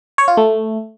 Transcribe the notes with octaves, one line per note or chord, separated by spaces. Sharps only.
C#5
F4
A3